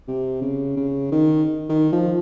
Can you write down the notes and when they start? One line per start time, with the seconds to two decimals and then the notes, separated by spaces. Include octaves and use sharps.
0.08 C3
0.41 C#3
0.77 C#3
1.12 D#3
1.69 D#3
1.92 F3